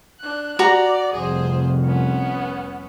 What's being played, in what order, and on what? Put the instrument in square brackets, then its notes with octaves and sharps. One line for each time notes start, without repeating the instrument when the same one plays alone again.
[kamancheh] D4 F#6
[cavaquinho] F#4 A#5 [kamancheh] D5
[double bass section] F1 C2 F2 [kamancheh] G#4 C5
[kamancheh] B3 C#4